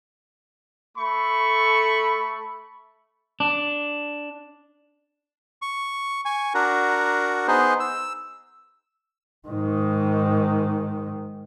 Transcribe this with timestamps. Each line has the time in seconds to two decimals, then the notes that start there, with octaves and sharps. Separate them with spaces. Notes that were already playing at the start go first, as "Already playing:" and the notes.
0.98 A3 A4 B5 C#6
3.40 D4
5.62 C#6
6.25 G#5 C#6
6.54 D4 F#4 A#4
7.48 B3 D#4 G#4 C5
7.80 E6
9.48 G#2 D#3